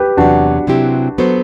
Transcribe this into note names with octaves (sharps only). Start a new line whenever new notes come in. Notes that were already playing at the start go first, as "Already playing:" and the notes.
Already playing: G4 B4
E2 C3 F#3 D4 F#4
C3 F#3 C4 E4 G4
F#3 B3 F#4 A4 C5